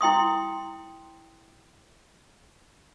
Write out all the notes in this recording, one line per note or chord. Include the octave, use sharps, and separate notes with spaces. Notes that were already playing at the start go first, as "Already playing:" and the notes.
E4 G5 C6 D#6